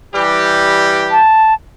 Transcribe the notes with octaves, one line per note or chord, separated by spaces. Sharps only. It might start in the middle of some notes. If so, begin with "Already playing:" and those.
E3 G3 G4
A5